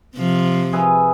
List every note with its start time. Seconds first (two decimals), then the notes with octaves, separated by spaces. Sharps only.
0.17 C3 F3
0.73 G#4 B4 E5